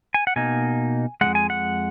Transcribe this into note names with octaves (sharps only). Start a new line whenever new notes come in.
G#5
F#5
B2 A#3 D#4 G#5
F2 D#3 G#3 F#5
G#5
F#5